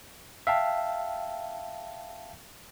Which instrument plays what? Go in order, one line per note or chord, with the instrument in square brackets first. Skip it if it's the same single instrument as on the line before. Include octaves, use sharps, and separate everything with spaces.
[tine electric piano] E5 F5 G5 A5